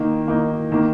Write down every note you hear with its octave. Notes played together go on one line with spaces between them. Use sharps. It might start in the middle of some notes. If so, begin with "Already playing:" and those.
Already playing: D#3 A#3 D#4
D#3 A#3 D#4
D#3 A#3